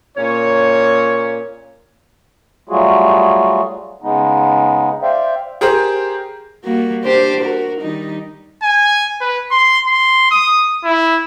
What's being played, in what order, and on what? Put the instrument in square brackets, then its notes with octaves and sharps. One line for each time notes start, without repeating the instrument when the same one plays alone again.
[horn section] A#2 C#4 C#5
[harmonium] F#3 G3 A3 F4 F#4 G#4
C#3 G#3 B3 D#4
C5 D5 E5 F5 G5
[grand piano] G4 G#4 A#4 C5
[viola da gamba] G3 A#3 F#4
D4 G4 C5
F#4 A#4
D#3 G3 D#4
[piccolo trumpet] G#5
B4
C6
C6
D#6
E4